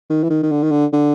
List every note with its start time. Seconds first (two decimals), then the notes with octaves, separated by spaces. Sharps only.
0.10 D#3
0.23 E3
0.30 D#3
0.43 D#3
0.51 D3
0.63 D#3
0.71 D3
0.93 D3